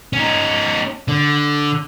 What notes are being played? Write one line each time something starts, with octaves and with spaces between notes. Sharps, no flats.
C#4 D#4
D3